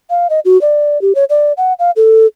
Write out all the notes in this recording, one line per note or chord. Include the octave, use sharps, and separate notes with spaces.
F5
D#5
F#4
D5
G4
C#5
D5
F#5
F5
A4